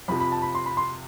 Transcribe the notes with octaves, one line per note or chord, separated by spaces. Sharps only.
F2 C3 F3 B5
B5
A5
B5
C6
B5
C6